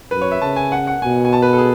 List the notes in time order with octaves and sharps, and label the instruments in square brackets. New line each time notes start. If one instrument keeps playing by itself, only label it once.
[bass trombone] F#2 [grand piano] B4
[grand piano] C#5
E5
[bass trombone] C#3 [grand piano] A5
[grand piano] G#5
F#5
F#5
[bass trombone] B2 [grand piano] G#5
[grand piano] G#5
A5
B4
A4
G#4